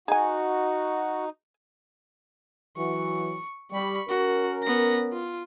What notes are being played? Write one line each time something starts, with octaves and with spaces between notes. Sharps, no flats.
D#4 F#4 G#4 G#5
E3 F#3 F#4 C#6
G3 B5 C#6
C#4 F#4 A#4
B3 A#6
F4